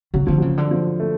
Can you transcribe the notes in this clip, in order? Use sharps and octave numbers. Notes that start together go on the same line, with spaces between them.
C#3 F#3
D3 F3
C#3 F#3
D3
F3
A3